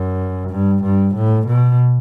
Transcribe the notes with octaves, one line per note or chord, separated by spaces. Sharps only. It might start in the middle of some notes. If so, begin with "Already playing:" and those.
Already playing: F#2
G2
G2
A2
B2